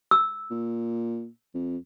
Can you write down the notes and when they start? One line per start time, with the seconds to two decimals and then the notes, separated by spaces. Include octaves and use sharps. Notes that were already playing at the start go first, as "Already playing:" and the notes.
0.11 E6
0.51 A#2
1.55 F2